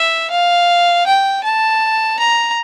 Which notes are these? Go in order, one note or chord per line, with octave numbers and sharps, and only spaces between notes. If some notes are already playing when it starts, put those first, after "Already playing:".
Already playing: E5
F5
G5
A5
A#5